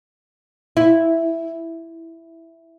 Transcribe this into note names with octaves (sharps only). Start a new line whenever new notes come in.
E4